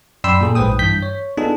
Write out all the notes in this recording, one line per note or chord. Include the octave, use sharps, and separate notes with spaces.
F#2 D5 G5 B5 C6 E6
A#2 G#4 A4
A#1 G#2 B4 C5 G5 D#6
G2 E3 G6 B6
C#5
B3 D4 D#4 F4 G#4 A4